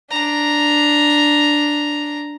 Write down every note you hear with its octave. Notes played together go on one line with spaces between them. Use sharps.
D4 A#5